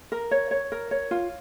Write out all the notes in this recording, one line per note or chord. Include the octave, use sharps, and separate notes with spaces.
A#4
C#5
C#5
A#4
C#5
F4